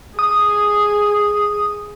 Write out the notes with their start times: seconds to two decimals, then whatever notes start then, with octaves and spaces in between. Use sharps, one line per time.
0.19 G#4 D#6